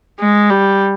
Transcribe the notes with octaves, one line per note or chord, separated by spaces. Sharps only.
G#3
G3